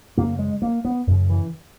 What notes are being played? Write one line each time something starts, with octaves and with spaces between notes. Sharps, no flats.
F#2 C#3 A#3
G#3
A#3
B3
F#2 C#3
E3